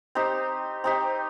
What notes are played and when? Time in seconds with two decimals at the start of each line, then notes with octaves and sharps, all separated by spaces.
0.15 C4 D#4 G4
0.84 C4 D#4 G4